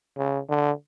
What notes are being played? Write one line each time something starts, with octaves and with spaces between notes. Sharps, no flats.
C#3
D3